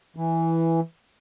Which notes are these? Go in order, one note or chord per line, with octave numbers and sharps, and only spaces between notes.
E3